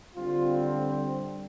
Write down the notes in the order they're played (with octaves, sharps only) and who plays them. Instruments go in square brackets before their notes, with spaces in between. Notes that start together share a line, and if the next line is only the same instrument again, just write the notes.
[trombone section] D3 G3 C4 F4